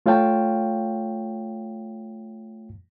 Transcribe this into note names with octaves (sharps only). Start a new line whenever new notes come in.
A3 F4 C#5 F5 G5 A5